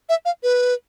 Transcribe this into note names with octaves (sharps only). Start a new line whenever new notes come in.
E5
F5
B4